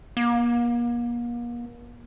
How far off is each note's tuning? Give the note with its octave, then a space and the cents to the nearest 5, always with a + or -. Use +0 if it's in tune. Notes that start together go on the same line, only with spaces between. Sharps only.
A#3 +40